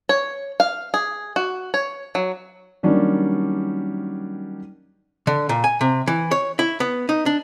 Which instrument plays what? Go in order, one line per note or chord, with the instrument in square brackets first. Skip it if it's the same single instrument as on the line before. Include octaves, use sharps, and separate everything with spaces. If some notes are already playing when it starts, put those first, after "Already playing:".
[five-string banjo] C#5
F5
G#4
F#4
C#5
F#3
[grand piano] D#3 F#3 G3 A#3 C#4 D4
[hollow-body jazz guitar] D3
A#2
G#5
C3
E3
C#5
E4
B3
D#4
D4